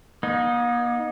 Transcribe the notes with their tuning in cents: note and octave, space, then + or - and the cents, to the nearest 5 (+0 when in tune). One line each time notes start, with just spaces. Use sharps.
A#3 +45 D#4 +0